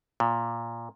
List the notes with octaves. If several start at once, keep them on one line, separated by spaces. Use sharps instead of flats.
A#2